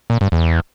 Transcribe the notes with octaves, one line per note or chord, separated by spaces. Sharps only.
A#2
G2
E2